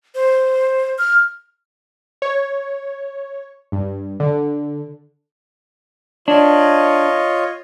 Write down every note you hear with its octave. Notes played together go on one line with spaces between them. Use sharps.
C5
F6
C#5
G2
D3
D4 F4 C#5 D#5